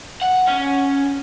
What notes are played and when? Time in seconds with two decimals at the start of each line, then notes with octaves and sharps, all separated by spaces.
0.21 F#5
0.48 C#4